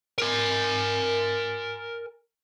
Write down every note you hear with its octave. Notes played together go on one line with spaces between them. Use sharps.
A#4 G#5